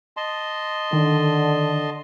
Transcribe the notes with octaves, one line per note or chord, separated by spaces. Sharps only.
D#5 A5 C6
D3 D#3